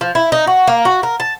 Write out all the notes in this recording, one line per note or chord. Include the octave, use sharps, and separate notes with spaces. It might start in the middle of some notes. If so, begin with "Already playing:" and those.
F3
E4
D#4
F#4
A#3
F#4
A#4
A5